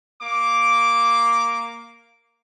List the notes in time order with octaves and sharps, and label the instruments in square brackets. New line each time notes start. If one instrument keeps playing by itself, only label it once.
[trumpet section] A#3 D6